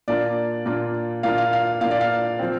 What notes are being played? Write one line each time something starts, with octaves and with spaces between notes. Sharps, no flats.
A#2 A#3 D4 F4 D5
A#2 A#3 D4 F4
A#2 A#3 D4 F4 F5
F5
F5
A#2 A#3 D4 F4 F5
D5
F5
F3 C4